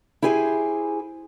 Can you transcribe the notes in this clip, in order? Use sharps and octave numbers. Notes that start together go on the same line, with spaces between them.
E4 G4 G#4 C5 G#5